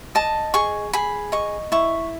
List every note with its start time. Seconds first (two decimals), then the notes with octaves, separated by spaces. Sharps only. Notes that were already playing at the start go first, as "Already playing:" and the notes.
0.15 D#5 A5
0.54 G#4 C#6
0.93 G#4 B5
1.32 D#5 C#6
1.72 E4 C#6